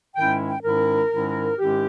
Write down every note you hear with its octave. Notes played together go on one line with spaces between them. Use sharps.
G#2 D#3 G#3 C#4 E4 G5
G5
G#2 D#3 G#3 C#4 E4 A#4
G#2 D#3 G#3 C#4 E4
G#2 D#3 G#3 C#4 E4 G4